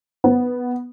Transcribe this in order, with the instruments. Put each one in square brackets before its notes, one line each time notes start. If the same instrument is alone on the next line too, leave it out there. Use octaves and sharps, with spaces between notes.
[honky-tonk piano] B3